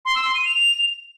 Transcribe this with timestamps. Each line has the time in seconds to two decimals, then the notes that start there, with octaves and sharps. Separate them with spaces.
0.05 C6
0.15 E6
0.25 C6
0.35 D#7
0.45 F7